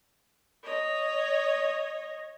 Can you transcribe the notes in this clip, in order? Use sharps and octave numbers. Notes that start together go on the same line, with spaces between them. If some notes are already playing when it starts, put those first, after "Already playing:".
C#5 D#5